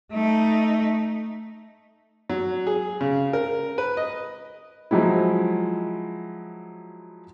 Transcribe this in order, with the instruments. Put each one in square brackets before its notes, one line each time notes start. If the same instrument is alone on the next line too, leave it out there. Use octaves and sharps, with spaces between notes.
[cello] A3 D#4
[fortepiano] F#3
G#4
C#3
A#4
B4
D#5
[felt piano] F3 F#3 G#3 E4